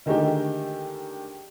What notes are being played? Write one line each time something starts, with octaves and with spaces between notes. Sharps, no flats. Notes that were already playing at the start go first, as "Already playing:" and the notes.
D3 D#3 G#3 A3 D#4 G4